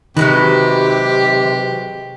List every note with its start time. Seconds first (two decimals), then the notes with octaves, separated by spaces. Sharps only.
0.17 C3 D#3 F#3 G#3 G4 B4